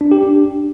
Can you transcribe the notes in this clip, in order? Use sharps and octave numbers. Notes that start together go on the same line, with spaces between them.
D4
G4
D4